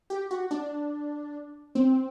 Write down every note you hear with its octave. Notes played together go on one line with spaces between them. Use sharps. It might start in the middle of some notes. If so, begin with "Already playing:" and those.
G4
F#4
D4
C4